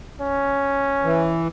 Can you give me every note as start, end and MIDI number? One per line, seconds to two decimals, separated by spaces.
0.20 1.44 61
1.04 1.48 52